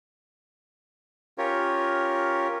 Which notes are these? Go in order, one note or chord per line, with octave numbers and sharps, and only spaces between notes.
C#4 F4 G4 A#4 C#5